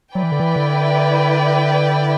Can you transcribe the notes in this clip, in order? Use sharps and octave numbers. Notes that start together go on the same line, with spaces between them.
F#3 E4 B4 D5 G5
E3
D3
E3
D3